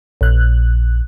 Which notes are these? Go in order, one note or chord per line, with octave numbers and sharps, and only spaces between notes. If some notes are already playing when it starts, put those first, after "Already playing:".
A#1 F#6